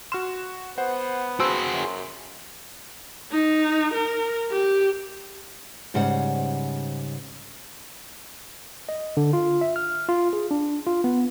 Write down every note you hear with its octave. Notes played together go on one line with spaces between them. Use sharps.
F#4 C6 F6 E7
B3 C5 F#5
F#4 G#4 C5 A5 C6 E6 D7
F#2
D#4
A#4
G4
G#2 C#3 G3 C5 F#5
D#5
D3
F4
E5
F6
F4
G#4
D4
F4
B3